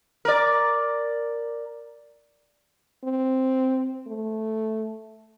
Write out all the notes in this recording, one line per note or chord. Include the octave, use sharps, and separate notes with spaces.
A#4 D5
C4
A3